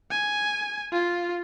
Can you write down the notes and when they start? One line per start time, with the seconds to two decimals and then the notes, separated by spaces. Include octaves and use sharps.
0.11 G#5
0.92 F4